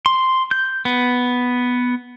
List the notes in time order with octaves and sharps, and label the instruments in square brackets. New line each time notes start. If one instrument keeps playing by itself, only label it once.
[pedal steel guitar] C6
G6
B3